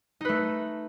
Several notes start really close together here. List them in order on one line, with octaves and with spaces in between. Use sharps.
D#4 B4 A3